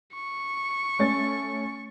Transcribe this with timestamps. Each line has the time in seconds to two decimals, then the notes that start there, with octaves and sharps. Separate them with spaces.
0.15 C#6
0.99 A3 C#4 A6